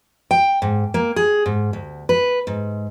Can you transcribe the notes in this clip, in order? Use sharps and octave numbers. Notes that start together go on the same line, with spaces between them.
G5
G#2
A#3
G#4
G#2
D2
B4
G#2